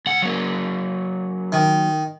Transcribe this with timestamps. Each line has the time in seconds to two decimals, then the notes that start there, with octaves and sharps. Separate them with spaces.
0.06 C#2 F#5
0.22 F#3 A#3
1.52 D#3